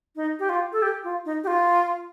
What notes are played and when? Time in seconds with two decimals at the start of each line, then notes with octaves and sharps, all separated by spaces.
0.16 D#4
0.39 G4
0.49 F4
0.73 A4
0.82 G4
1.04 F4
1.25 D#4
1.44 G4
1.47 F4